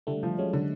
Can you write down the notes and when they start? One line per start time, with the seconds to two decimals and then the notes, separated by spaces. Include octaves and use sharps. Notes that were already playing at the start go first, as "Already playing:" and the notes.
0.07 D3 G3 A3
0.23 F3
0.38 F#3 G#3 C#4
0.53 D3